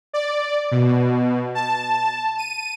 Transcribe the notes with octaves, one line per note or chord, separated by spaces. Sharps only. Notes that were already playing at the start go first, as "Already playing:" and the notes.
D5
B2
A5
D#7